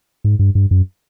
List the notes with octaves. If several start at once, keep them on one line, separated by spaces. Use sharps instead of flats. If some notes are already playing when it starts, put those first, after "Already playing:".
G#2
G2
G2
F#2